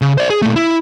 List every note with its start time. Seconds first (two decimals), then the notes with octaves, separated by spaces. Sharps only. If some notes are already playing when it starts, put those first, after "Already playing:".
0.02 C#3
0.18 C5 D5
0.30 G#4
0.42 A#2 A3
0.56 E4